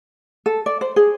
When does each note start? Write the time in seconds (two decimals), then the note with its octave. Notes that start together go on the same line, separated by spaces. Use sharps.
0.46 A4
0.66 D5
0.81 C5
0.96 G#4